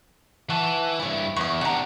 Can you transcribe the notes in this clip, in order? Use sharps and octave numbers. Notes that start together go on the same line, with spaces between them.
E3 F#5 A5 C#6
G2 E4 C#5 D5
E2 C#6 D#6
C3 D4 F#5 A#5